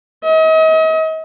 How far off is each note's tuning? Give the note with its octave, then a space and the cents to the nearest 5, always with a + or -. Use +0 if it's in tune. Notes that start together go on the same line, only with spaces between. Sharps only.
D#5 +40